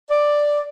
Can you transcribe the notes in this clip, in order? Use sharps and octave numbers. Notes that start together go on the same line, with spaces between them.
D5